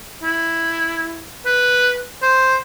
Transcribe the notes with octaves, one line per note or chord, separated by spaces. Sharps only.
E4
B4
C5